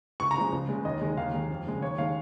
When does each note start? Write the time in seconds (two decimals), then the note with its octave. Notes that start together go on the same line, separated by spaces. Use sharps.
0.20 C#2 C#6
0.31 A#5
0.36 C#3 F3 G#3
0.52 C#2
0.69 C#3 G#3
0.85 D#2 D#5
1.01 D#3 G#3
1.17 D#2 F5
1.33 D#3 G#3
1.50 F2
1.66 C#3 G#3
1.82 D#2 C#5
1.98 D#3 G#3 F5